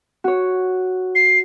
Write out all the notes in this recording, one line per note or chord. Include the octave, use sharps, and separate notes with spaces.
F#4 C#5
C7